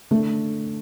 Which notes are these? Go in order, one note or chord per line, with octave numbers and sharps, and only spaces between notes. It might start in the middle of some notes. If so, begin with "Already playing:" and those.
D3 A3